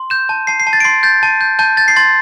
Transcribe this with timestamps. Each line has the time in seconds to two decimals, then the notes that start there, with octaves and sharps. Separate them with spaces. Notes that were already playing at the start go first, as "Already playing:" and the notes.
Already playing: C6
0.10 G6 E7
0.29 A5
0.47 A5 C7
0.60 C7
0.67 A5
0.73 A6
0.80 D7
0.84 C6 C7
1.03 G6 A6
1.23 A5
1.41 G6
1.59 A5 G6
1.77 G6 A6
1.88 C7
1.96 C6 A6